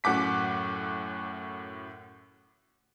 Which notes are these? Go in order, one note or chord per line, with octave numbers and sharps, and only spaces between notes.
F#2 A2 F#5 D6 B6